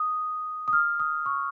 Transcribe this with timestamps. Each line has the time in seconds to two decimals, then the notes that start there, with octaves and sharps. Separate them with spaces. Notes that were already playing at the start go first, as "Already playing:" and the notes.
Already playing: D#6
0.68 D#6
0.73 F6
1.00 D#6
1.26 C#6